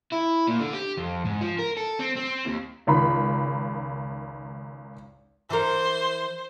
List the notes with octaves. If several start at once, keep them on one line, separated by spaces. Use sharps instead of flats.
E4
A#2
D3
G4
F2
G#2
F3
A#4
A4
C4
C4
D#2
G#1 C#2 D#3 B5
E3 A#4 C5